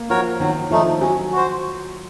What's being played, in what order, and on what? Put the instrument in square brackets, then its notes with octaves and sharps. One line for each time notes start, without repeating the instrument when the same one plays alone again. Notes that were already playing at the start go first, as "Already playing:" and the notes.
Already playing: [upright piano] A#3
[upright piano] F3 [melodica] F#4 A#4 C#5
[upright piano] D#3 [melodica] F#3
[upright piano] F3 [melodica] A3 D#4
[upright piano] F#3 [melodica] C#4
[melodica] F#4 C5